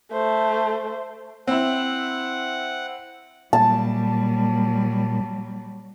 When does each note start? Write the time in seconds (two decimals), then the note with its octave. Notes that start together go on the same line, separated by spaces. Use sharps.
0.12 A3 C5
1.47 C4 E4 F#5
3.53 A#2 F#3 G3 A5